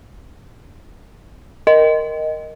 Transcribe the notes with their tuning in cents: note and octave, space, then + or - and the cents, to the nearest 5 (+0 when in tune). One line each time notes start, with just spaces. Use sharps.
A#4 +0 D#5 +0